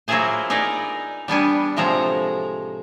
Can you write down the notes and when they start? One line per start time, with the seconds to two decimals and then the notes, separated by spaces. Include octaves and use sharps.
0.08 F#3 A#3 E4 F4 G#4 C5
0.50 D#4 G#4 A#4 B4 D5
1.28 G3 B3 D4 G#5
1.77 A2 C3 F3 G#3 A#5